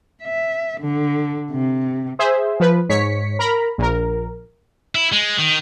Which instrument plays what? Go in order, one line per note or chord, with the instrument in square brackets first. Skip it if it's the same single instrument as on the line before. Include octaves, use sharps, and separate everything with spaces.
[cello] E5
D3
C3
[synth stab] G#4 C5 E5
F3 B4
G#2 C#5 B6 C#7
A#4 A#5 B5
A#1 A#4
[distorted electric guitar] E4
G#3
D#3